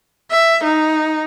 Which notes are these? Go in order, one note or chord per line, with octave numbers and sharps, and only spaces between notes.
E5
D#4